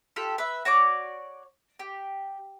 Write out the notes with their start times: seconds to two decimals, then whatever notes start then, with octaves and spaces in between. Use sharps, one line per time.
0.16 F4 G4 A4
0.38 B4 E5
0.65 F#4 C#5 D5 D6
1.79 G4